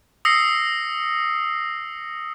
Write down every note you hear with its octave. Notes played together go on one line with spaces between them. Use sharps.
D#6 E6 A#6 C7 C#7